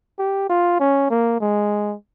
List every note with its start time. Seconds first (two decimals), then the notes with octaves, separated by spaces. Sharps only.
0.19 G4
0.49 F4
0.80 C#4
1.10 A#3
1.41 G#3